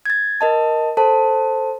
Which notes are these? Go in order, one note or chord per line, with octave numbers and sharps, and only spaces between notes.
G#6 A6
A#4 D#5 A5
A4 C5 A5